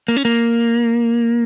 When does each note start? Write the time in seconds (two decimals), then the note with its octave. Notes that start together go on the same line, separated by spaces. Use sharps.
0.08 A#3
0.16 C#4
0.25 A#3